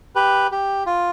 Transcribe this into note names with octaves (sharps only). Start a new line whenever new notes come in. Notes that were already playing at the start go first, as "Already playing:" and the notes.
G4 B4
G4
F4